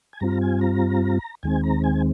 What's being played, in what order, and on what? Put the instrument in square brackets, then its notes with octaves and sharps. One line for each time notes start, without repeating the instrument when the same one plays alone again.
[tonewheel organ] G#5
G2 G3 C4 F4 A#5
G#5
A#5
D#2 D#3 G#3 C4 G#5
A#5
G#5